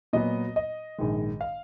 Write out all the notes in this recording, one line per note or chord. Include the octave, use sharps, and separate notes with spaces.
A#2 F#3 B3 D#5
D#5
A#1 G#2 D#3 G#3
F5